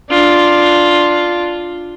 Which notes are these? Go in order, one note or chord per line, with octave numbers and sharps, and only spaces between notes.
D4 F4